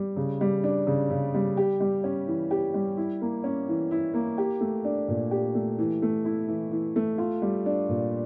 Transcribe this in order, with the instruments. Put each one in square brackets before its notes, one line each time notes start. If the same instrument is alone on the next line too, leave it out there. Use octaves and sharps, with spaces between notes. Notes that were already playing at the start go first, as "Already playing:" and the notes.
Already playing: [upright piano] G3
C#3
G3
D4
C#3
C#3
G3
G4
G3
C#4
E3
G4
G3
E4
A#3
C#4
E3
E4
A#3
G4
A3
D4
A#2
G4
A3
E3
A3
E4
E3
E3
A3
F4
G3
D4
A#2